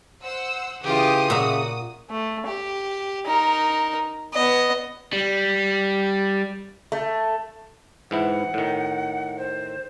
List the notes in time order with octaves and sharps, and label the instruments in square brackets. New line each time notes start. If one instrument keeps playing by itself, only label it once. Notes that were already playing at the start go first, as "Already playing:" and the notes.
[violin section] C5 F#5 E6
[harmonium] C#3 E3 [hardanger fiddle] F4 G4 [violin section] D#6
[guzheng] A#2 E5 A#5 [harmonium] C#3 [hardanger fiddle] F#4
[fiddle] A3
G4
D#4 A#4
B3 D#5
[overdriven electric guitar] G3
[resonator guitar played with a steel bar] A3
[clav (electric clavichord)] G#2 E3 E4 [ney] F#5
[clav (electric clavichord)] A2 D#3
[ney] C5